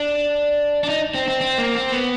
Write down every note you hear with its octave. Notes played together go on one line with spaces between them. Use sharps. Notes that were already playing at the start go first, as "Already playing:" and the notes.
Already playing: D4
D4
D#4
C4
C4
C4
A#3
C4
B3